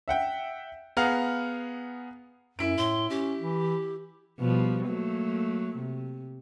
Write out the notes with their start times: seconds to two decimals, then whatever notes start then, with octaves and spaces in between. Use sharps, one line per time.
0.08 E5 F#5 G5
0.97 B3 G#4 F5 F#5 A#5 F6
2.59 F#2 E4 D7
2.78 A2 C6
3.10 C#4 G4
3.39 E3
4.39 B2 F3 G3
4.86 F#3 A3 A#3
5.76 C3